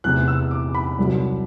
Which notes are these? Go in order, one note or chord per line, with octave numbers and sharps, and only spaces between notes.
E2 C3 E3 A3 F#6
E6
D6
B5
C2 C3 F#3